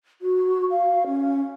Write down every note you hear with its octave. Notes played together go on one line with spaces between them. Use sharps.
F#4
F5
C#4